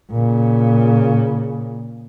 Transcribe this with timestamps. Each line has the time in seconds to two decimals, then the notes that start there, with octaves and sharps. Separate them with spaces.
0.12 A#2 C#3